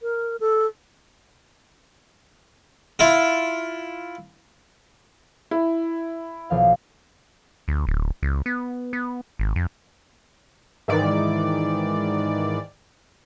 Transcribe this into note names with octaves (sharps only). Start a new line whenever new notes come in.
A#4
A4
E4 F4
E4
B1 F3 F5
D2
D1
C#2
B3
B3
G#1
F2
G#2 D#3 E3 D5